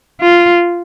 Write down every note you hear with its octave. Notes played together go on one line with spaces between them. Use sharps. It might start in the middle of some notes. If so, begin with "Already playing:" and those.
F4